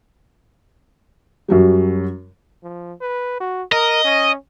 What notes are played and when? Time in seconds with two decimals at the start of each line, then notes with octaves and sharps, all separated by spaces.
1.48 F#2 F#3 G3
2.63 F3
3.01 B4
3.40 F#4
3.72 A#4 D#5
4.05 C#4